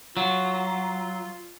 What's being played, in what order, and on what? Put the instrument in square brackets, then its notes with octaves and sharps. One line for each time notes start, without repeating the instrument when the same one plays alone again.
[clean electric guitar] F#3 [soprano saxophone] F4